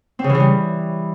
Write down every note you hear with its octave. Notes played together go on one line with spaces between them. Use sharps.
C4
C#3
E3
C#3
G3